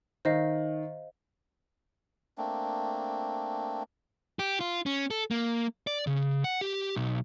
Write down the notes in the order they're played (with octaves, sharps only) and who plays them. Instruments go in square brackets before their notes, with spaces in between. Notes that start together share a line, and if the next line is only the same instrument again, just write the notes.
[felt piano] D#3 [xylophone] C5 D#5 F5
[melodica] A3 A#3 C4 D4
[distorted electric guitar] G4
F4
C#4
A4
A#3
D5
C#3
F#5
G4
B1